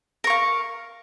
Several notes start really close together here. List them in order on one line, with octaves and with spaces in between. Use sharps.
A#4 C#6 F5